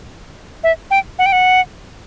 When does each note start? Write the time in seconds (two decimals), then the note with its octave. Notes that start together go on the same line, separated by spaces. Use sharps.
0.64 E5
0.91 G5
1.19 F#5
1.26 G5
1.32 F#5